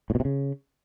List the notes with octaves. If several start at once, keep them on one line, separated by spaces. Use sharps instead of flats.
A2
B2
C3
C#3